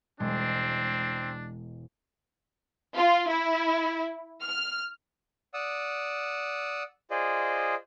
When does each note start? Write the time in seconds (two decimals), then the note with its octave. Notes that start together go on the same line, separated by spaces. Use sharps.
0.20 E1 G#3 C4 D4
2.96 F4
3.28 E4
4.42 F6
5.54 D5 F#5 D#6 E6
7.11 F4 G#4 C5 D5 D#5